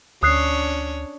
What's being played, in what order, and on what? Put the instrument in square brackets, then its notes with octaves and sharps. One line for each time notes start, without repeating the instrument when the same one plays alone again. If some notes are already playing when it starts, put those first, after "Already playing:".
[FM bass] D2 [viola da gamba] C#4 D4 C#5 [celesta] D#6 F#6 C7